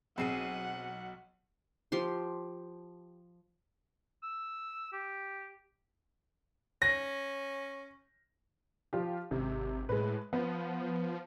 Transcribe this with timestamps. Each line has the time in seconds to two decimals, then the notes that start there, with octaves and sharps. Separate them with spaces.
0.18 B1 C4 G#4 F#5 C7 D#7
1.92 F3 G4 C6
4.23 E6
4.93 G4
6.82 C#4 A#6
8.93 F3 F4 G4
9.31 G#1 C3
9.89 A2 G#3 B4
10.33 F3 B3